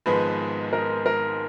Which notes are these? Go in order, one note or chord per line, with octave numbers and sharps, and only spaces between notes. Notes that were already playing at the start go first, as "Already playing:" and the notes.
G#1 G#2 F3 G#3 B3 B4
A#4
A#4